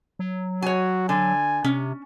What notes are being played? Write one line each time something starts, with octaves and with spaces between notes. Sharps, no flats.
F#3
F#4 C#5 G#5
D3 G#5
C3 C#4